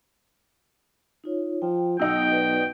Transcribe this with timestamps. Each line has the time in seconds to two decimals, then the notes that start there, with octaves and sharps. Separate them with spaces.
1.24 D#4 F4 C#5
1.62 F3 G5
1.99 B1 B2 D#4 G5 E6
2.32 B4 D5